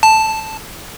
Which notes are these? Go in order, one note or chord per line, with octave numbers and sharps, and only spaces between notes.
A5